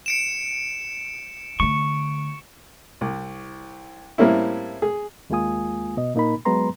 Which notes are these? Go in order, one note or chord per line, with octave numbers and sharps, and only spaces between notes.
C#7 D7 E7
D3 A3 C#6
C2
A2 G3 A#3 C4 C#4 E4
G#4
D#2 G#3 A#3 F4 G#5 D#6
B2 D#5
A#2 A#3 D#4 A#4 B5
F#3 G#3 B3 B4 A#5 C6